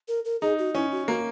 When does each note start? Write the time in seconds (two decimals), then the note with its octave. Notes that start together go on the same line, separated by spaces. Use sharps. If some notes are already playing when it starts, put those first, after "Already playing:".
0.08 A#4
0.25 A#4
0.41 D#4 G#4
0.59 F#4
0.75 C#4 E4
0.91 F#4
1.08 A#3 F#4